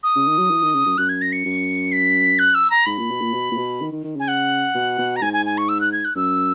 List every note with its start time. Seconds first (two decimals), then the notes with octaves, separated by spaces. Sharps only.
0.03 D#6
0.15 C#3
0.27 D#3
0.38 F#3
0.50 E3
0.62 D#3
0.75 C#3
0.86 F#2
0.98 F#2 F#6
1.09 G#6
1.22 A#6
1.32 C#7
1.45 F#2
1.92 B6
2.39 F#6
2.55 E6
2.70 A#5
2.86 G#2 B5
2.98 A#2
3.10 B2
3.21 A#2
3.34 B2
3.51 A#2
3.57 B2
3.81 D#3
3.92 D#3
4.04 D#3
4.16 C#3 G#5
4.28 F#5
4.75 B2
4.98 B2
5.16 A#5
5.22 G#2 G#5
5.33 G#5
5.46 G#5
5.58 C#6
5.69 E6
5.81 F#6
5.92 G#6
6.05 F#6
6.16 F#2 E6